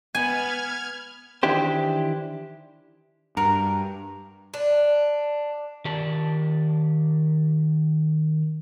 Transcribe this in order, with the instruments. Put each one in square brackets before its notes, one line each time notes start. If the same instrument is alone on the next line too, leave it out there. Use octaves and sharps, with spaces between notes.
[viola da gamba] B3 B4 [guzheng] G#5 [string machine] F6 G#6
[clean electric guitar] D#3 E3 D4 E4 G4 C5
[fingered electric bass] G2 [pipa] F#4 A#4
[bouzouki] D4
[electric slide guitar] D#3 G4 D5 A5